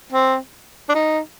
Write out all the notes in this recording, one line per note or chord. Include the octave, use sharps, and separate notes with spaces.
C4
D4
D#4